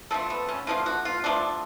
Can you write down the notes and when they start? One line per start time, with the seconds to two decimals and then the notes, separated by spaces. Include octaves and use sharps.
0.11 D3 F3 A3 A4
0.30 B3
0.49 C#4
0.67 D3 F3 A3 F4
0.86 F#4
1.05 F4
1.24 D3 F3 A3 D4